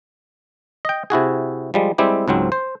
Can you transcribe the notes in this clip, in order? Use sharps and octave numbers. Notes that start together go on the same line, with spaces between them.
D#5 G5
C3 E4 F#4 G#4
F3 G3 G#3
G3 G#3 C4 E4 G4
C#2 G#2 F#3 C4
C5